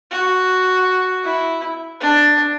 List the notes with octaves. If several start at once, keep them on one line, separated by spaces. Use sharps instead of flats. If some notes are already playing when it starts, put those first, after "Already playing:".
F#4
E4
D4